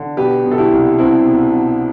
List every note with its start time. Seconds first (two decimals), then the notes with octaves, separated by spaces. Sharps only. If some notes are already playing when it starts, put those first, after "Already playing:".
Already playing: D3
0.17 B2 G4 B4
0.45 B2
0.51 A4
0.58 E4 G4
0.72 C2
0.98 C2 C4 E4
1.26 B2
1.53 B2